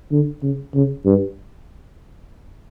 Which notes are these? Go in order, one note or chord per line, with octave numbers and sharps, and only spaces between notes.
D3
C#3
C#3
G2